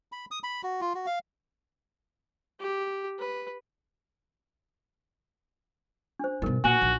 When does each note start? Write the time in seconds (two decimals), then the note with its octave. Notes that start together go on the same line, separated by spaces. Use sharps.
0.12 B5
0.31 D#6
0.43 B5
0.63 F#4
0.81 F4
0.95 F#4
1.06 F5
2.60 G4
3.19 B4
6.19 D4 C5
6.42 G2 B2 D#4 A#4
6.64 A#2 F#4 G#5
6.82 A#1